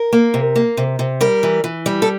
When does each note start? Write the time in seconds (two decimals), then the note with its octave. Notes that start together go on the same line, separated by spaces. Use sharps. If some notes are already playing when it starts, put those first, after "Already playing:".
Already playing: A#4
0.13 A#3
0.34 C3
0.56 A#3
0.77 C3
0.99 C3
1.21 G3 A#4
1.43 E3
1.64 E3
1.86 G3
2.02 A4